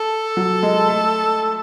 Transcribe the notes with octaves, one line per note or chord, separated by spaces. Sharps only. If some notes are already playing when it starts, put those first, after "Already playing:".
Already playing: A4
F#3
G#3
A3